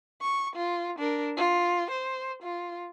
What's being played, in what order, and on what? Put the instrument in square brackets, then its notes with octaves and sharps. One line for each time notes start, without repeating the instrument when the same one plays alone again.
[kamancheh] C#6
F4
D4 A#4
F4
C5
F4